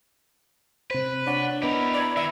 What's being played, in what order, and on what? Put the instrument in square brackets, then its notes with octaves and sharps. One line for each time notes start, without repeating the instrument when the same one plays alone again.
[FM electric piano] C3 C5 [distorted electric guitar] B4
[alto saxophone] D4 [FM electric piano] C#5 F#5
[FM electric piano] B3 D#5 [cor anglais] E4 [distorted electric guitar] G4 A#4
[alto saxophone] D5 [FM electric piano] B5 G#6
[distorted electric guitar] D#3 [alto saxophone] E5